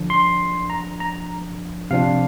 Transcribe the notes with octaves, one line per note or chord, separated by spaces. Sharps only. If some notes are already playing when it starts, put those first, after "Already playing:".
Already playing: D3 F3 D4
C6
A#5
A#5
C3 F3 D4 F5